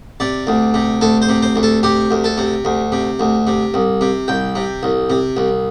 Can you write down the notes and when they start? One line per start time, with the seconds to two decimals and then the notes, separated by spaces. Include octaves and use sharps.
0.20 C3 D5
0.47 D2
0.74 C3
1.01 D2 A4
1.22 C5
1.29 C3
1.42 C5
1.56 D2
1.63 A4
1.83 C3 G4
2.11 D2
2.24 A4
2.38 C3
2.65 D2
2.92 C3
3.20 D2
3.47 C3
3.74 C2
4.01 C3
4.28 C2 G5
4.55 C3
4.83 C2
5.10 C3
5.37 C2